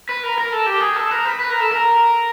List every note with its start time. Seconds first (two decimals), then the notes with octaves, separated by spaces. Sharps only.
0.09 B4
0.23 A#4
0.38 A#4
0.52 A4
0.66 G4
0.81 G#4
0.96 A4
1.11 A#4
1.25 B4
1.39 B4
1.50 A#4
1.60 A4
1.72 A#4